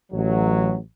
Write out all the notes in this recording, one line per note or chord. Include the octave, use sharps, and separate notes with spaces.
A1 F#3